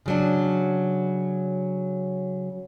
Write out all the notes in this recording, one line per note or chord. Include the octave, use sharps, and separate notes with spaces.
C#3 F#3 D4